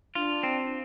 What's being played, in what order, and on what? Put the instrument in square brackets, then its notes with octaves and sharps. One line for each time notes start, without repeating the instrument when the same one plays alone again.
[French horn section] D4 [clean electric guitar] F4
[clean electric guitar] C4